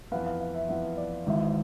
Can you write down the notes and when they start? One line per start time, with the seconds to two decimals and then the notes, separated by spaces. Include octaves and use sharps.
0.12 F2 E3 B3 F5
0.26 F5
0.40 F5
0.54 E5
0.69 F2 E3 B3 E5
0.97 D5
1.26 G#1 G#2 E3 E5